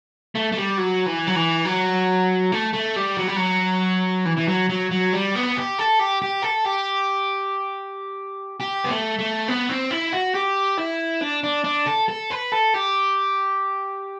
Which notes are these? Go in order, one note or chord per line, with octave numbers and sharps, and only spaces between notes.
A3
A3
G3
F#3
E3
F#3
E3
F#3
A3
A3
G3
F#3
G3
F#3
E3
E3
F#3
F#3
F#3
G3
B3
G4
A4
G4
G4
A4
G4
G4
B3
A3
A3
B3
C4
E4
F#4
G4
E4
D4
D4
D4
A4
A4
B4
A4
G4